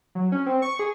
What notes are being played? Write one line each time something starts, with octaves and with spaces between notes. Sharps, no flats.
F#3
C#4
C4
C#6
G#4